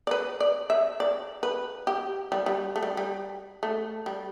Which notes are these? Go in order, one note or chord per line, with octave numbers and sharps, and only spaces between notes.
D5
B4
D5
E5
D5
B4
G4
G3
G3
A3
G3
G3
A3
G3